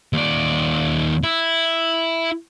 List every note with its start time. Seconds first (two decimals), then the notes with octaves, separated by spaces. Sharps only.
0.13 D#2 D5
1.23 E4